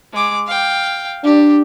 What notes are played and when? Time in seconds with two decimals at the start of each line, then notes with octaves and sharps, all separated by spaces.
0.13 G#3 D6
0.46 F5 G5
1.24 D4 G4